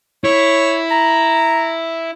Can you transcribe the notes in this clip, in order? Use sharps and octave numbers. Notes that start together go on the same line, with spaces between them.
E4 C#5
A#5